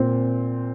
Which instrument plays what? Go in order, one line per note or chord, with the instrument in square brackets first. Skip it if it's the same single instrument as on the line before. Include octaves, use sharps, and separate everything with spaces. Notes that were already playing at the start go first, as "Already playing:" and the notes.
Already playing: [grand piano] A#2 C4